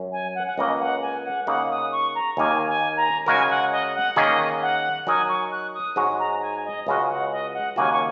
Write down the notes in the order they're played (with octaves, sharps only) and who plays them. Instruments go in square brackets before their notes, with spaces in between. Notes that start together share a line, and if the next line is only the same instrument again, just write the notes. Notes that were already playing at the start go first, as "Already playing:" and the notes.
Already playing: [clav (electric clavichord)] F#2 F#3 C#4
[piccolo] G#5
F#5
F#5
[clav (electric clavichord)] C#2 C#3 A#3 [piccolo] D#5
[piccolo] F#5
G#5
F#5
[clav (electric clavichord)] C#3 A#3 D#4 [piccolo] F#5
[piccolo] D#6
C#6
A#5
[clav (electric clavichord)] D#2 D#3 A#3 [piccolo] G#5
[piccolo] G#5
A#5
[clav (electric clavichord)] C#3 G#3 F#4 A#4 [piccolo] G#5
[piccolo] F#5
D#5
F#5
[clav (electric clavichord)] D#3 A#3 C#4 G#4 [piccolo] D#5
[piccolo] F#5
[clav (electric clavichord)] F#3 D#4 A#4 D#5 [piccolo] G#5
[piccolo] C#6
F#6
D#6
[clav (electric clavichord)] G#2 G#3 F#4 C#5
[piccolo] A#5
G#5
D#5
[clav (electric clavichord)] C#2 C#3 G#3 F#4 [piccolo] D#5
[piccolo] F#5
D#5
F#5
[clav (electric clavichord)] D#2 C#3 A#3 F#4 [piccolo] G#5
[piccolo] C#6